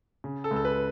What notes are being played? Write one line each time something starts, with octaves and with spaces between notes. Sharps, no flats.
C#3
A4
C#2
A4
B4